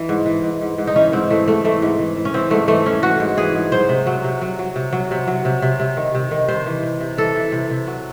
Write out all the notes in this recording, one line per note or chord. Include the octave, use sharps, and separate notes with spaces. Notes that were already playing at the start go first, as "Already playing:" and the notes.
Already playing: E3
G#2
E3
G#2
G#2
G#2
D#4
E3 C#4
G#2 C4
E3 A3
G#2 A3
E3 A3
G#2
E3
E3
C#4
E3 C4
G#2 A3
E3 A3
E3 C#4
E3 F#4
G#2
E3 G#4
G#2
F#3 C5
C3
F#3
C3
F#3
F#3
C3
F#3
C3
F#3
C3
C3
C3
D#3
C3
D#3
C3 C5
E3
C3
C3
E3 A4
E3
C3
C3
F#3